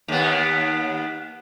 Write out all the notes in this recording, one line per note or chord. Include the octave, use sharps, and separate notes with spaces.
D#2 B3